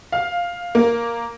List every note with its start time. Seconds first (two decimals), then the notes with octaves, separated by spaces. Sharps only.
0.12 F5
0.75 A#3